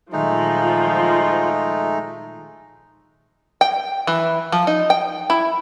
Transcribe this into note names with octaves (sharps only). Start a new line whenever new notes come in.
A#2 D#3 F3 F#3 G#3 A3 D#4 F4
G5
E3
F3
D#4
G5
E4